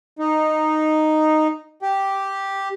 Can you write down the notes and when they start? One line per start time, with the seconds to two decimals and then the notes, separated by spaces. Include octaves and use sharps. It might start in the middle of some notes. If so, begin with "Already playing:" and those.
0.19 D#4
1.82 G4